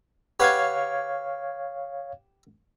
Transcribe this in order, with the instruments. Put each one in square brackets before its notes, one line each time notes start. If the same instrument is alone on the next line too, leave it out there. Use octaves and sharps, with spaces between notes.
[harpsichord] G4 B4 F#5 [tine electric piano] C#5 F5 G#6